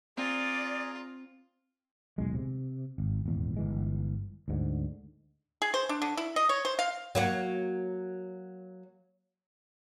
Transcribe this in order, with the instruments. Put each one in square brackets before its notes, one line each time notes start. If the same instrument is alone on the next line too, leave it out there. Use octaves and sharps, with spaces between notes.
[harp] C4 [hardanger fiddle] F4 [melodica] G#4 A#5 [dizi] D5
[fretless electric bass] D#1 B1 G#3
C3
G#1
D#1 G#1 E2
G1 E3 G#3
D2 G#2 D3
[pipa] G#4
C5
D4
D3
E4
D#5
C#5
C5
F5
[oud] F#3 A#3 F#4